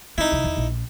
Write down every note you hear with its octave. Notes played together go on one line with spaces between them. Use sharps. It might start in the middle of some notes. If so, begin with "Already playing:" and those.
C4 D#4 E4
C2 F4
E2
A#1